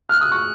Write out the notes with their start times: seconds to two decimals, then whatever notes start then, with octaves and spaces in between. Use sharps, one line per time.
0.09 F6 F#6
0.21 D#6
0.32 C#6